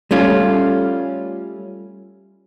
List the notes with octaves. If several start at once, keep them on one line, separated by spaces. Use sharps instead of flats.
G3 A3 C#4 F4